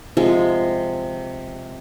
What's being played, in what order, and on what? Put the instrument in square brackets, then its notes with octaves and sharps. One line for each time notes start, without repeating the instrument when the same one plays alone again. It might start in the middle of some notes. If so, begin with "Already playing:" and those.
[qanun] C3 F3 G#3